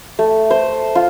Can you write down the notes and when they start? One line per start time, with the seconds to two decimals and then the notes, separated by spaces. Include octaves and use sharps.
0.19 A3
0.50 C5
0.95 F4